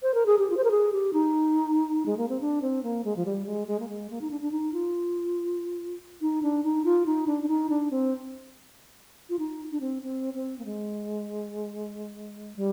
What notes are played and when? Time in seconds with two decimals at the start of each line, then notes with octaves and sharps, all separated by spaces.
0.03 C5
0.14 A#4
0.26 G#4
0.39 G4
0.50 F4
0.57 C5
0.64 A#4
0.71 G#4
0.93 G4
1.13 D#4
2.06 G#3
2.17 A#3
2.29 C4
2.41 D4
2.62 C4
2.83 A#3
3.04 G#3
3.16 F3
3.26 G3
3.46 G#3
3.68 G#3
3.80 A#3
3.89 G#3
4.10 A#3
4.21 D#4
4.31 D4
4.41 D4
4.52 D#4
4.73 F4
6.21 D#4
6.43 D4
6.64 D#4
6.85 F4
7.06 D#4
7.27 D4
7.43 D4
7.48 D#4
7.70 D4
7.91 C4
9.30 F4
9.39 D#4
9.72 D4
9.81 C4
10.03 C4
10.34 C4
10.59 A#3
10.65 G#3
12.56 G3